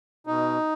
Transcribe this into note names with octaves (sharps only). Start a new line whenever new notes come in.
B2 D#4